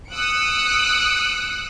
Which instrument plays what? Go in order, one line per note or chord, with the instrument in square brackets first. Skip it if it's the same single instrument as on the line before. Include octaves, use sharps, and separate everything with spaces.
[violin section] D#6 E6 F#6 C#7 D7